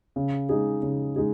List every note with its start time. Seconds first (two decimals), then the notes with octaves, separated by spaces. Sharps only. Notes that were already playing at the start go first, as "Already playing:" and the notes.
0.16 C#3
0.49 G#3 D#4 G#4
0.82 C#3
1.16 G#3 D#4 G#4